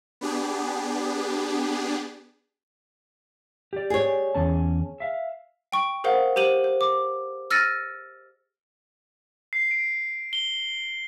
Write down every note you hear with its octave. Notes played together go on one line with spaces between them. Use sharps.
B3 D4 G4 G#4
G4 D5
G#4 C#5
E2 C#4 A5
E5 F5
G5 C#6 D7
G#4 A#4 C5 F5 F#5
G4 C5 D#7 F#7
C5
D6
E6 F6 A6 A#6 C#7 D#7
C7
D7
G7